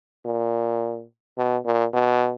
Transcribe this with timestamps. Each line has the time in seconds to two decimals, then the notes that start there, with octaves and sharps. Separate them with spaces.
0.25 A#2
1.38 B2
1.66 A#2
1.93 B2